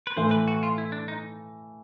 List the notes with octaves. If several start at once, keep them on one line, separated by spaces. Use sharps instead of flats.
B4
A2 E3 A3 C5
B4
F#4
F4
E4
D4
D#4